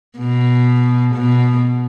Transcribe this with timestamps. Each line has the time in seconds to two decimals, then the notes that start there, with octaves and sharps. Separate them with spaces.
0.18 B2
1.14 B2